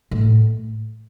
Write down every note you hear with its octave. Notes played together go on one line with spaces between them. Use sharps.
A2